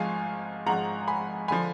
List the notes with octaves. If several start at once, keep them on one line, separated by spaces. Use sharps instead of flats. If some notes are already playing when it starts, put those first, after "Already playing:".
Already playing: G#1 G#2 F3 F5 G#5
G#1 G#2 F3 F#5 A#5
G#5 B5
D3 F3 G#5 B5